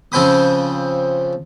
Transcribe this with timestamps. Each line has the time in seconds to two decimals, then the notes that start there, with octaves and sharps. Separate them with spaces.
0.12 C#3 F3 C4 G5 B5 D#6